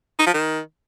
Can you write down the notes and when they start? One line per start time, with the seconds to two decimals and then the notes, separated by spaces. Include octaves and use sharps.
0.19 D#4
0.27 F3
0.34 D#3